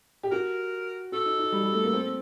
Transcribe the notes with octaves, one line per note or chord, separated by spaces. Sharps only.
G4
F#4 A#4
F#4 A4
D#4
D#4
G3
G3
A3
A#3
C4